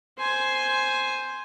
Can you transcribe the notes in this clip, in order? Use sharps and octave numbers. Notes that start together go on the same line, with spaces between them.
C5 G#5